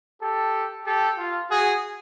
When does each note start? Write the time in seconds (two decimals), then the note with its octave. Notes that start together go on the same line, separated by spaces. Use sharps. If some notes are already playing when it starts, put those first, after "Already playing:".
0.21 G4 A4
0.86 G4 A4
1.18 F4
1.51 F#4 G#4